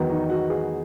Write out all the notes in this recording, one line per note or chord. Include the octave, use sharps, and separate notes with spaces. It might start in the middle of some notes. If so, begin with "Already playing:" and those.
Already playing: E2 D#3 F#3 B3
D#4
F#4
G#4